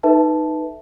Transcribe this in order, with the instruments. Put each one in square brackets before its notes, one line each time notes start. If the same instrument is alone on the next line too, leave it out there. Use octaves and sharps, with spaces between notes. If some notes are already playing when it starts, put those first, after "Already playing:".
[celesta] D#4 A4 B4 E5 A5